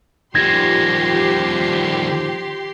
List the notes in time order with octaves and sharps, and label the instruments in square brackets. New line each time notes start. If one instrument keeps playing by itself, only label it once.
[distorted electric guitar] D#3 G3 [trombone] F3 [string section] G4 C6 [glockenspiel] G#6 A#6